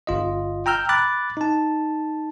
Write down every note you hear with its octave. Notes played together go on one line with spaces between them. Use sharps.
G1 F4 D#5
G5 A#5 E6 F6 G6
B5 D6 F#6 A6
D#4 A5